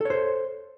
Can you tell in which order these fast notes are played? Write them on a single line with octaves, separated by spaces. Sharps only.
A4 C#5 C5